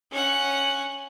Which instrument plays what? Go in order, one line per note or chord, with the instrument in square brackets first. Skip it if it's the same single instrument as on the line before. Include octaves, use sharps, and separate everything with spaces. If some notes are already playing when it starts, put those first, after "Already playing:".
[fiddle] C#4 F#5